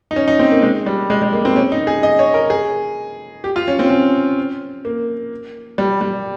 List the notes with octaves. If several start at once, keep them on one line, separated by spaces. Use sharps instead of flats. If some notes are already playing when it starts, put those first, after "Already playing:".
D#4
C#4
D#4
C4
A#3
G#3
G3
G#3
G#3
A#3
C4
C#4
D#4
G#4
D#5
C#5
A#4
G#4
G4
F4
C#4
C4
C#4
A#3
G3
G3